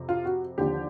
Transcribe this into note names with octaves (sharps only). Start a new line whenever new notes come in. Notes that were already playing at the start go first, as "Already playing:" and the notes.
Already playing: F2 C3
F4
F#4
D#2 D3 F3 G4